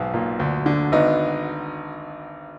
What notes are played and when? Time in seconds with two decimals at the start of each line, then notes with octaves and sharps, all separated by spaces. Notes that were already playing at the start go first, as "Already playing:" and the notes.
Already playing: B1 G#2
0.14 A#2
0.40 D2
0.66 D3
0.92 G#1 B3 D#4